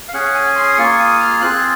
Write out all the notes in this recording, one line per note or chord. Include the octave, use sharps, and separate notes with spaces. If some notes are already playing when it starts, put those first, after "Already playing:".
F5
C#4 G#4 F#5
G#5
C6
D#6
A#3 F4 G#4 C#6
D#6
F6
C4 F4 G#4 F#6